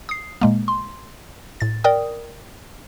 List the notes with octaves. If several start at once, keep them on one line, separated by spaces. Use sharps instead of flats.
D#6 C7
A#2 G#3 A#3
C6
A2 A6
A#4 D5 G5 D#6